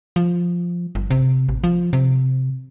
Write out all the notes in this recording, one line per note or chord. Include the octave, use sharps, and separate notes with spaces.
F3
G1
C3
A1
F3
C3